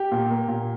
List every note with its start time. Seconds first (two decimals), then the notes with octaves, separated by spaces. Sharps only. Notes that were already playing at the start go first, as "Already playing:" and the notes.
Already playing: G4
0.12 A#2
0.30 A#3
0.48 A#2